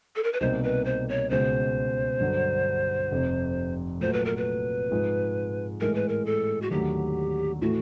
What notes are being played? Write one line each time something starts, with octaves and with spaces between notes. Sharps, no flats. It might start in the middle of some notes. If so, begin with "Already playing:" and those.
A4
A#4
B4
C2 B2 G3 A#3 D#4 C5
B4
C5
C#5
C#2 B2 G#3 C5
G2 D3 F#3
F1 F2 C3
A#2 F#3 A3 C5
B4
A#4
B4
G#2 F3 G#3
A2 E3 G#3 A#4
B4
A#4
A4
F#4
D#2 D3 F#3 A3 G4
A2 E3 A3 F#4